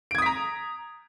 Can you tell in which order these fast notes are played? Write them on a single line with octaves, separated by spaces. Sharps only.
D7 G#6 D#6 B6 A#5